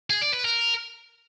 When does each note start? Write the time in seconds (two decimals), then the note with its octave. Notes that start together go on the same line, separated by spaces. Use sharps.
0.10 G#4
0.22 D5
0.33 B4
0.45 A#4